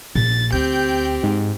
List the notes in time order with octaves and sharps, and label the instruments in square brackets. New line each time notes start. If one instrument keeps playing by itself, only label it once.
[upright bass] A#1 [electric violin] A6
[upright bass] D2 [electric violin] C4 G4 [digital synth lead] G6
[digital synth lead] G#2